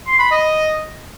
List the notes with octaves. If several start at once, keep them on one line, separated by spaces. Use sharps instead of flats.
C6
B5
D#5